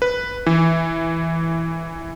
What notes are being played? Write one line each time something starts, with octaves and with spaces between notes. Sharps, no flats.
B4
E3